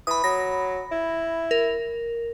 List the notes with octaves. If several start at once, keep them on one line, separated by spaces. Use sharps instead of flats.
E3 B5 D#6
F#3 B5 A#6
E4
A#4